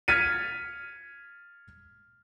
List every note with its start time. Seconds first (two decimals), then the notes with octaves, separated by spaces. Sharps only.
0.08 F6 G#6 A6 B6 C#7 D#7